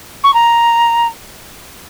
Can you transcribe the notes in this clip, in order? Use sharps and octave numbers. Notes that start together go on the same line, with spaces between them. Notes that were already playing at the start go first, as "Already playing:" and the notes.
C#6
A#5